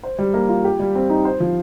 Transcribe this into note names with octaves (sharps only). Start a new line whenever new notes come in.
C5
G3
A#3
F4
G4
G3
C4
D#4
C5
F3